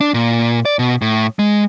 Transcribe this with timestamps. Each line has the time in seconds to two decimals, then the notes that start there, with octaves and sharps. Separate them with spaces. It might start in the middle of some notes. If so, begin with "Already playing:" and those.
0.01 D4
0.14 A#2
0.65 D5
0.79 B2
1.02 A2
1.39 G#3